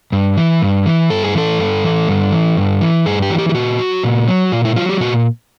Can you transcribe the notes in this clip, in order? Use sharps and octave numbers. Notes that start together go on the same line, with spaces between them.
G2
E3
G2
E3
G2 A4
G#4
E3 A4
G2
E3
G2
E3
G2
E3
G2 G#4
G4
E3 F#4
G4
G4
A#2 F#4
F#3
A#2
F#3
A#2 F4
E4
F#3 F4
G4
A#2 F#4